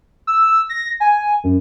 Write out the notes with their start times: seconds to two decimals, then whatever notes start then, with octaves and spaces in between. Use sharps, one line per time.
0.27 E6
0.69 A#6
1.00 G#5
1.44 F#2